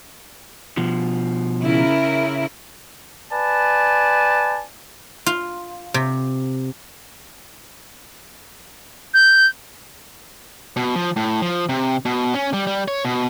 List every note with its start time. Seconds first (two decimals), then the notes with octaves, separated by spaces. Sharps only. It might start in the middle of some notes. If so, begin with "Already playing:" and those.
0.77 B2 F3
1.61 C#3 E4 A#4
3.33 B4 D5 G#5 A5
5.26 F4
5.94 C3
9.13 G6
10.77 B2
10.95 F3
11.16 A2
11.42 F3
11.69 C3
12.05 B2
12.34 C#4
12.54 G3
12.67 G3
12.88 C#5
13.05 B2